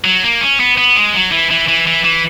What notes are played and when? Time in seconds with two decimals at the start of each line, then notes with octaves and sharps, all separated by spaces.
0.04 F#3
0.23 A#3
0.41 C#4
0.60 B3
0.77 B3
0.96 G#3
1.14 F#3
1.32 E3
1.51 E3
1.68 E3
1.87 E3
2.04 E3